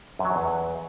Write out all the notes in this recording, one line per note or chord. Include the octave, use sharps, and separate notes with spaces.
F#2
F#3
F#2
E2